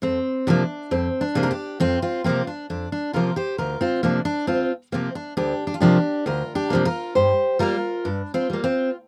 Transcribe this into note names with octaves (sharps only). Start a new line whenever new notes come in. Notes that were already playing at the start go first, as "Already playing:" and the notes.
F2 C4
C3 F3 A#3 D4
F2 C4
D4
C3 F3 A#3
A#4
D4 G4
F2 C4 F4
C4 F4
C3 F3 A#3 C4 F4
D4
F2 D4
D4
C3 F3 A#3 F4 A#4
G4 C5
D2 F4 A#4
C4 F4
C3 F3 A#3 D4
D4
D2 C4 F4
C3 F3 A#3 C4
D4
D2 D4 G4
D4
F4
C3 F3 A#3 D4 G4
D2 F4 A#4
D4 G4
C3 F3 A#3
F4 A#4
G2 G4 C5
G3 A#3 F4 A#4
G2 D4
C4 F4
G3 A#3
C4 F4